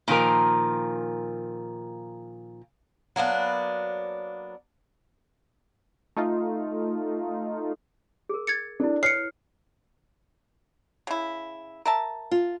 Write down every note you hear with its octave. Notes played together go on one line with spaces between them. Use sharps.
A#2 D#3 F3 A#4
F#3 A#3 B3 D4
A3 D#4 F4
G#4 A#4
G#6 A6 C#7
D4 E4 A4
B4 C#5 F6 C7 C#7
C#3 E4
A#4 E5 A5
F4